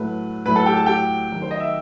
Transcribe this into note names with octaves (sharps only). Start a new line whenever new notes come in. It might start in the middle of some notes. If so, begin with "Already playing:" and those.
Already playing: A2 F#3 A3 B4
A2 F#3 A3 B4 B5
A4 A5
G4 G5
A4 A5
G4 G5
D#3 F#3 A3
C5
D#5
E5